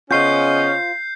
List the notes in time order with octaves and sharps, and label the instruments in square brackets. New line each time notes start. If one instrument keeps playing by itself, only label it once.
[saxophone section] C#3 B3 D#5 [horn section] C#4 [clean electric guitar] F4 C5 [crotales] G6 C7